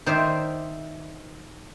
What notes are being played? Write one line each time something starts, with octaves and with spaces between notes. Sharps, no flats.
D#3 C5 D5 E5